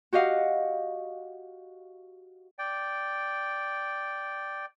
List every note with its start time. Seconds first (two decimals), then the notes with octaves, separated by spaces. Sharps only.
0.13 F#4 G4 D#5 F5 F#5
2.59 D5 G5